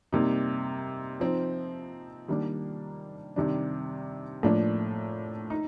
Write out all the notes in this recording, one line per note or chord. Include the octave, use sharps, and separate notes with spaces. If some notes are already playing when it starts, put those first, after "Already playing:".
C3 G3 A#3 D#4
F3 C4 D#4
D#3 G3 A#3 D4
C3 D#3 G3 D4
A2 F3 A#3 D4
D#4